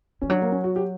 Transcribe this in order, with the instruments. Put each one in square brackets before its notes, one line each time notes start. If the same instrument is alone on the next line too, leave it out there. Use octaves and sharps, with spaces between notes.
[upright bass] E3 [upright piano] C#4
[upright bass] F#3 [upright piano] D4
[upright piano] A#3
C#4
F#4
G4